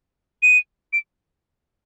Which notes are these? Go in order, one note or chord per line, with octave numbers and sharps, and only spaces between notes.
D#7
D7